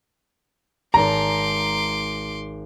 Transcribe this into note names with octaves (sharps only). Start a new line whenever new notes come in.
G#1 A5 A#5 C6 D6